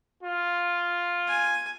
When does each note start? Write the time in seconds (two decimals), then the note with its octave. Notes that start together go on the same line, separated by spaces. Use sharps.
0.23 F4
1.27 G#5